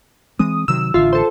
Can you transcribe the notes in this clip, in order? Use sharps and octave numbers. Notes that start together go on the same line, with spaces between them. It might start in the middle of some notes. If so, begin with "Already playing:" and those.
E3 G#3 C4 D#6
C3 D#3 F#3 E6
A1 D3 F4 E5
A4 C5